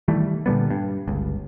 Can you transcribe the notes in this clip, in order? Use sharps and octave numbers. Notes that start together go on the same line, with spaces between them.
D#3 E3 G3 A3
A#2 D3 G3 B3
G2
G1 C#2